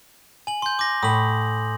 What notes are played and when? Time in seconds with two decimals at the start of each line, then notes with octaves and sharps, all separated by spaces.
0.47 G#5 F#7
0.62 C6 G6
0.79 D6 A#6
1.03 A2 B5 D#6 F#7